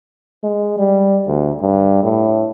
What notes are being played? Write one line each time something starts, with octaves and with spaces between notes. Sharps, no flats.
G#3
G3
D2
G2
A2